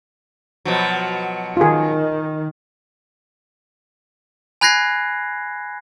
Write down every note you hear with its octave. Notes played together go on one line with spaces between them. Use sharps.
B2 F3 F#3
D#3 F4 G#4
G#5 B5 F#6 G#6 A#6 C7